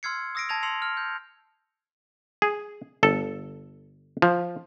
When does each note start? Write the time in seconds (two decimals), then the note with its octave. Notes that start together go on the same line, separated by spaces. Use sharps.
0.03 C6 E6 F6 G#6 C7 C#7
0.35 D#6 E6 A#6 C7 D7
0.49 A5 G#6 A#6 F7
0.63 C6 E6 C7 C#7 F7
0.82 F6
0.97 G6
2.42 G#4
3.03 G1 A4
4.22 F3